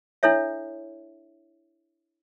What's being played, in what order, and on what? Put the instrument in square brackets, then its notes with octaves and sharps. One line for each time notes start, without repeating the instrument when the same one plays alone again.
[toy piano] D4 E4 A4 C#5 E5